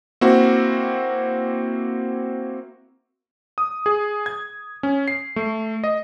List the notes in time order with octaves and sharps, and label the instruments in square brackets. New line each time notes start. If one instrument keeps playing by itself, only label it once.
[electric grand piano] A#3 C4 E4 F#4
D#6
G#4
G#6
C#4
C7
A3
D#5